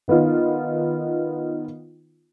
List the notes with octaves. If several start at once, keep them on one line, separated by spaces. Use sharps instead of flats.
D#3 B3 D#4 F4